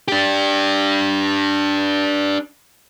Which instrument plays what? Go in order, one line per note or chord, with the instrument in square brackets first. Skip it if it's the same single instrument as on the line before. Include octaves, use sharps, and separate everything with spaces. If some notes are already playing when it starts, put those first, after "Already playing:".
[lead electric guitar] D4 G4